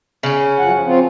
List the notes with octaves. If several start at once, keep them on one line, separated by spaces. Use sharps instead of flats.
C#3 C#4
F#2 F3 F#5
F3
F3 C4 F4